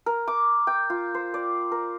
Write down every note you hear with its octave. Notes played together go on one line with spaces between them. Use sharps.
A#4
D6
G5
F4
C5
D5
A#4